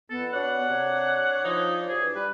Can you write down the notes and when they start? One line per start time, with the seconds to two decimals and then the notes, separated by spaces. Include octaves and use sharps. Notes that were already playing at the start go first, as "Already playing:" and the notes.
0.10 F2 B3 A4
0.33 D4 F#4 C#5 D5 F#5
0.69 C3 C#5
1.44 F3 D#4
1.88 G2 E3 G#4
2.15 G3 B4